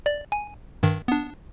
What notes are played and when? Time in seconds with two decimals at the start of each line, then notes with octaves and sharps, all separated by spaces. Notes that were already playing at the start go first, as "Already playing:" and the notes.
0.06 D5
0.32 G#5
0.83 G2 D#3
1.08 B3 D4